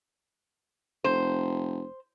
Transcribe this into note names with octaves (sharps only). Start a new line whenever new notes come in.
F1 C5